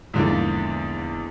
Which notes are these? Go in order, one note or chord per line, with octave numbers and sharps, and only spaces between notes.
E2 G#2 D3 F3 A#3